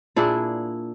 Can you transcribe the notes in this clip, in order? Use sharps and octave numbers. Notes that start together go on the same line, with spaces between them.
A#2 D4 E4 G#4